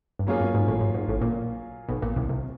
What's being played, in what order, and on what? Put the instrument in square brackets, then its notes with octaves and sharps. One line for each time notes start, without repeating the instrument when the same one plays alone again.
[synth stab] G2
[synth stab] G#2 [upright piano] F#3 A#3 C#4 F4 G#4
[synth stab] G2
G#2
A1 A2
G#2
G#2
A1 A2
A#1 A#2
B1 B2
A#1 A#2
C2 C3
C2 C3